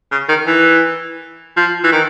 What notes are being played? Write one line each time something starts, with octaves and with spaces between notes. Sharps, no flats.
C#3
D#3
E3
F3
E3
D#3